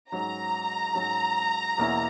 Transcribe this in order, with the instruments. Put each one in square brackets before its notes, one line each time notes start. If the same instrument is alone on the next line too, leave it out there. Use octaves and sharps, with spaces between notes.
[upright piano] G#2 F#3 C#4 [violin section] A#5
[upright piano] G#2 F#3 C#4
E2 B2 A#3 C#4 E4